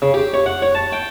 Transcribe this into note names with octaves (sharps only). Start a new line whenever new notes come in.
C#3
G4
C#5
F#5
C#5
A5
G5